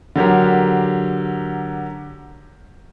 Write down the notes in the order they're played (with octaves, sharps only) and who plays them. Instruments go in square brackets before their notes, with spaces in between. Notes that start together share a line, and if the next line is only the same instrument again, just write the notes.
[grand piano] D3 F#3 G4 A#4